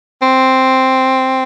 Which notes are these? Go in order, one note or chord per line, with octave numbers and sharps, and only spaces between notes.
C4